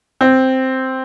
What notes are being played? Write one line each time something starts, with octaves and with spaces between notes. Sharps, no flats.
C4